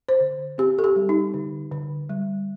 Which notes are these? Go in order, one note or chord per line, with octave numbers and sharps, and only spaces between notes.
C5
D3
C4 G4
A4
G4
G3
D#4
D3
D3
G3